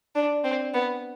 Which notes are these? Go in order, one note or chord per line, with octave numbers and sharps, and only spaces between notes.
D4
C4
B3